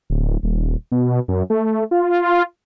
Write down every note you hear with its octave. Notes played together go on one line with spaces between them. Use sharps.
D1
D#1
B2
F#2
A3
F4